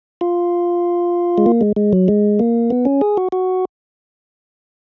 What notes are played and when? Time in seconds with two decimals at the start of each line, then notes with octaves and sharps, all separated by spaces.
0.21 F4
1.38 G#3
1.46 A#3
1.61 G#3
1.76 G#3
1.93 F#3
2.08 G#3
2.39 A#3
2.70 B3
2.85 C#4
3.01 G#4
3.17 F#4
3.32 F#4